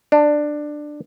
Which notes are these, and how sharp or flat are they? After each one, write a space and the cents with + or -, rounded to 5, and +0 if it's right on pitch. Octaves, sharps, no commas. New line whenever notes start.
D4 +15